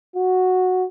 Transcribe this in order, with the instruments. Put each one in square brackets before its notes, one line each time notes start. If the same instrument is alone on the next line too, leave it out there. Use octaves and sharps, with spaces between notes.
[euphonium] F#4